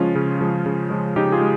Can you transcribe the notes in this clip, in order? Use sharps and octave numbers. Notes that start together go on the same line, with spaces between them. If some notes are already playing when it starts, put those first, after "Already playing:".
Already playing: C#3 F3 G#3 C#4 F4
C#3
F3 G#3
C#3
F3 G#3
C#3 D#4 G4
F4 G#4
G#3